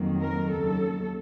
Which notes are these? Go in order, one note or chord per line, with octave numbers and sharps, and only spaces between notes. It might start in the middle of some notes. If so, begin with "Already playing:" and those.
Already playing: F2 D#3 F#3 A#3
A#4
D#2 C#3 F#3 A4